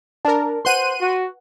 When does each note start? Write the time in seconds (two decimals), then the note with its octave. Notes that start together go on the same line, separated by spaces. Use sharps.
0.25 D4 A#4 A5
0.65 B4 C5 F#5 C6 F#6 D#7
1.00 F#4